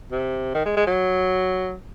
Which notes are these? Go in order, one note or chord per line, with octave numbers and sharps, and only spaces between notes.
C3
D#3
G#3
G#3
F#3